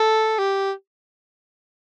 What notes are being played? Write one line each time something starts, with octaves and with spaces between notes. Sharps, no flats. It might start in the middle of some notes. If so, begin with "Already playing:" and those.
Already playing: A4
G4